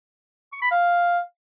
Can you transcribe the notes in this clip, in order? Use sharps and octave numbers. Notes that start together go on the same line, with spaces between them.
C#6
B5
F5